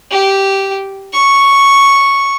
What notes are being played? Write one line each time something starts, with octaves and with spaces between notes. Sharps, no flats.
G4
C#6